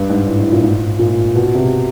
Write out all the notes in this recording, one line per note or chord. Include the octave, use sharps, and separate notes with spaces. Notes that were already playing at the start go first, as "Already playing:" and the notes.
Already playing: G2
G#2
A2
A2
A#2
G#2
A#2
B2
C3